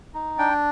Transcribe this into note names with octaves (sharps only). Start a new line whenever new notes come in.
D#4
D4 G5